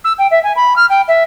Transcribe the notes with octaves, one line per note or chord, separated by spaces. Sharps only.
E6
G5
E5
G#5
B5
F6
G5
E5